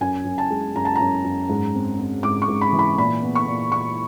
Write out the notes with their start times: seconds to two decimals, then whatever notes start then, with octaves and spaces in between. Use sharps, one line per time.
0.01 F#2 G#5
0.25 F#2
0.38 A5
0.51 G#3
0.75 F#2 A#5
0.85 A5
0.96 F#2 A#5
1.24 F#2
1.49 G#2
1.75 C4
1.99 C4
2.23 G#2 D6
2.42 C#6
2.48 G#2
2.61 B5
2.73 E3
2.79 B5
2.98 A#2 B5
3.23 B3
3.35 C#6
3.48 A#2
3.72 A#2 C#6